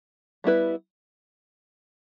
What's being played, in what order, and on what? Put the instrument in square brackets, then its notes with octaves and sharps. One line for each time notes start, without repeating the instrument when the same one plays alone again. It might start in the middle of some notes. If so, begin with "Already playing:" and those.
[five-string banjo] G3 B3 E4 B4